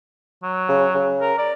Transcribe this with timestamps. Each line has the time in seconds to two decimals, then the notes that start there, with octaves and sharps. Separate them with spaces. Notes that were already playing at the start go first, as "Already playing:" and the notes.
0.43 F#3
0.69 C#3
0.94 C#3
1.21 A#4
1.38 D5